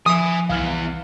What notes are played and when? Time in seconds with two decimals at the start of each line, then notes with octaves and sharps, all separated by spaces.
0.06 F3 E5 G#5 D#6
0.49 C2 E3 B3 F5 F6 F#7